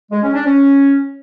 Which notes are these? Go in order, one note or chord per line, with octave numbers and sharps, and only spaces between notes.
G#3
C#4
D4
C#4